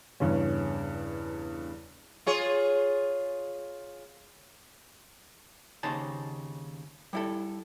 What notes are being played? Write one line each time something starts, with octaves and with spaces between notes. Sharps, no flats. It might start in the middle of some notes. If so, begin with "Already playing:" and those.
E2 G2 C#3 C#4
F4 G#4 C#5
D#2 C#3 D#4 C5 A5
G3 E4 A4